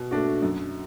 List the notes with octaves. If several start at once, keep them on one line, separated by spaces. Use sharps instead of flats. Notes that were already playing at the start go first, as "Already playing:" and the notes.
Already playing: B2
A3 D4 F#4
F#2